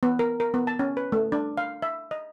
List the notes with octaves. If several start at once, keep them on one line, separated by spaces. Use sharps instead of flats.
B3
A#4
A#4
B3
A5
C#4
B4
A3
D4
F5
E5
D#5